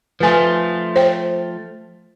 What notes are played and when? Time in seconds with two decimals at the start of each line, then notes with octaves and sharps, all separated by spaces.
0.20 F3 A3 F4 B4 G#5
0.96 C5 G5